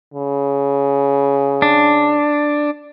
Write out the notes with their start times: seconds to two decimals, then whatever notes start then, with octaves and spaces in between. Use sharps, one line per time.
0.14 C#3
1.62 D4